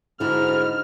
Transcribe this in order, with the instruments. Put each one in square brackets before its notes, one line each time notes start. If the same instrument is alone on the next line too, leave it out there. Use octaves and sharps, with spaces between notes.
[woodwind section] G#2 [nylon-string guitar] D3 E4 F#4 [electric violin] F6